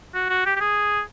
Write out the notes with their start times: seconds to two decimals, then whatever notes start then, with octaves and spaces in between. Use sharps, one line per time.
0.15 F#4
0.30 F#4
0.46 G4
0.56 G4
0.61 G#4